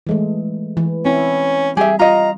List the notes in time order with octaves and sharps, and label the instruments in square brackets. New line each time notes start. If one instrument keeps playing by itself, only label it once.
[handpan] E3 G#3 A3
E3
[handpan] C4 E4 [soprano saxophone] C#4
[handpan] G3 [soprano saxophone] G4 [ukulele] G#4 E5
[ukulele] F4 D#5 [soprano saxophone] A#5